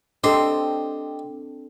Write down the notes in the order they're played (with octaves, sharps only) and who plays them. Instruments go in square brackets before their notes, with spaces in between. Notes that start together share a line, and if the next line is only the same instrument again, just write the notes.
[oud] C4 [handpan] D4 A4 [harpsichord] G4 D#5 A5